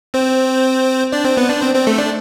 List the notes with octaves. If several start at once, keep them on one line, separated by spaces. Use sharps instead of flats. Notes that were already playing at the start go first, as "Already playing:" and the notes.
C4 C5
D4 D5
C4 C5
B3 B4
D4 D5
C4 C5
C4 C5
A3 A4
D4 D5